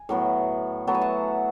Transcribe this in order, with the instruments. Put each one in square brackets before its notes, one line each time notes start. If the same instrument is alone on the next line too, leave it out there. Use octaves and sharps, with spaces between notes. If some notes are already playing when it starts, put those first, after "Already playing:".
Already playing: [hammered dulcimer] G#5
A2 F#3 B3
A2 F#3 B3 A5
G#5
F#5 A5